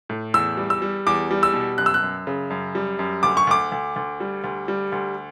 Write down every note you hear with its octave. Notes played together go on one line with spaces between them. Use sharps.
A2
E2 E6
G3
E6
G3
E2 D6
G3
E6
B2
F#2 F#6
E6
F#6
F#2
C#3
F#2
G3
F#2
D2 D6
C#6
D2 D6
D2
D2
G3
D2
G3
D2